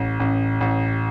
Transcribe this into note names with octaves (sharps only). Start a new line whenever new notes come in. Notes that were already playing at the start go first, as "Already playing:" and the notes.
Already playing: A1
A1
A1